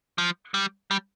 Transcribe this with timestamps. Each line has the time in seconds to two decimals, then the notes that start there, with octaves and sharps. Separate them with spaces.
0.18 F3
0.54 G3
0.91 G3